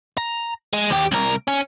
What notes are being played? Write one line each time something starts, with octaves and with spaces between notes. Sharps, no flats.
A#5
G#3
D#2 G4
C2 A#4
C#4